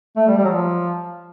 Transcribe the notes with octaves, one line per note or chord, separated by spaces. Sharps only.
A3
G3
G3
F#3
F3